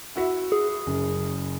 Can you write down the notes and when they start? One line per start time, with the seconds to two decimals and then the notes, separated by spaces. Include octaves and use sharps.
0.16 E4 F#4 E5
0.52 G#4
0.86 F#1 F#2